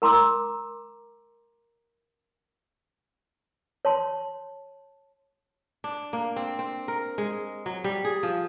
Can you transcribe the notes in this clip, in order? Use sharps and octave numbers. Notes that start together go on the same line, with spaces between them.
A#4 A#5 C6 D6 E6
C#5 A5 C6
D4
A#3
C4
C4
A#4
G#3
F#3
G3
G#4
F3